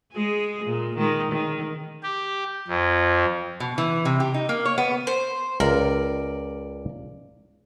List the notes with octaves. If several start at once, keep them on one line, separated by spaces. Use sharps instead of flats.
G#3 G#4
A#2
D#3 G#3
D#3
G4
F2
B2
E3
C3
G4
D#4
A#3
C#5
B3
C5
C#2 A#4 D5